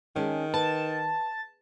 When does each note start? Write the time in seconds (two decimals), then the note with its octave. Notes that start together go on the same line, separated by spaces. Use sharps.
0.16 D#3 G#3 C#4 D4
0.54 B4 A5